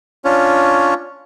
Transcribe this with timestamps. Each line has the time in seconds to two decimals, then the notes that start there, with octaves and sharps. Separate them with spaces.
0.25 C#4 D4 F4 C#5